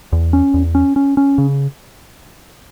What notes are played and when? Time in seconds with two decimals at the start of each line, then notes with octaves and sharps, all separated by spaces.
0.12 E2
0.33 C#4
0.54 E2
0.75 C#4
0.96 C#4
1.17 C#4
1.38 C#3